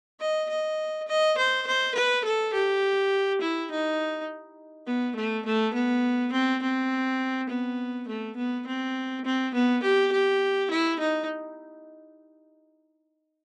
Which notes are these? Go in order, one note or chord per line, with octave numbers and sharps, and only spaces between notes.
D#5
D#5
D#5
C5
C5
B4
A4
G4
E4
D#4
B3
A3
A3
B3
C4
C4
B3
A3
B3
C4
C4
B3
G4
G4
E4
D#4